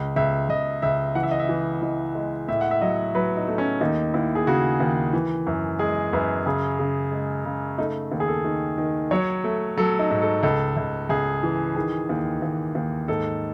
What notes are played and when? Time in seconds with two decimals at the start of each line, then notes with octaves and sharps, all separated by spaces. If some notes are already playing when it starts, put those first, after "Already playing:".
Already playing: C#2
0.16 C#2 E5
0.49 C#2 D#5
0.82 C#2 E5
1.15 E3 F#5
1.23 E5
1.31 D#5
1.39 E5
1.49 E3
1.82 E3 D#5
2.15 G#3
2.48 A2 E5
2.61 F#5
2.71 E5
2.81 F#3 D#5
3.15 F#3 B4
3.37 D#4
3.48 A3
3.58 C#4
3.81 D#2 D#4
4.14 D#2 E4
4.35 G#4
4.47 C#3 F#4
4.80 D#2
5.13 E3
5.47 F#2
5.79 G#3 G#4
6.13 F#2 B4
6.46 C#3 G#4
6.79 C#3
7.12 G#3
7.45 C#3
7.78 A3 D#4
8.12 D#2
8.20 G#4
8.28 A4
8.45 D#3
8.78 D#3
9.11 F#3 C#5
9.44 A3
9.78 F#3 A4
9.99 D#4
10.10 G#2
10.22 A4
10.43 C#2 A4
10.77 C#2
11.09 C#2 G#4
11.43 E3
11.76 D#3 G#4
12.09 D#2
12.42 D#2
12.75 D#2
13.08 G#2 A4